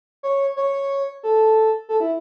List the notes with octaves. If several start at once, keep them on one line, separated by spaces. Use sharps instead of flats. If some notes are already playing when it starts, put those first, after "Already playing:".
C#5
C#5
A4
A4
E4